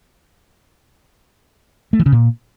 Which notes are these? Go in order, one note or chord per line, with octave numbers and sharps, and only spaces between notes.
A3
E3
C#3
A#2